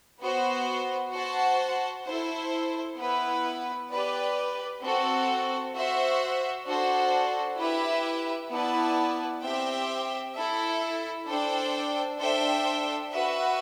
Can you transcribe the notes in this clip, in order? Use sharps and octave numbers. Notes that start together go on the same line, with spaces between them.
B3 F#4 C5
F#4 C5 F#5 A5
E4 A4 C5
B3 E4 B4
G4 B4 D5
C4 F#4 A4
F#4 C5 E5
D4 F#4 A4 C5
E4 G4 B4 E5
B3 E4 B4 D5 A5
C4 G4 C5 E5 G5
E4 A4 E5
D4 A4 C5 G5
D4 A4 C5 E5 G5
F#4 B4 E5